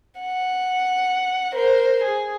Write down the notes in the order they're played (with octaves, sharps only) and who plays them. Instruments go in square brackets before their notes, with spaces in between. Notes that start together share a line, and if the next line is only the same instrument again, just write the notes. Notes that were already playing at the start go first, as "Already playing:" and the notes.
[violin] F#5
A#4 C5
G#4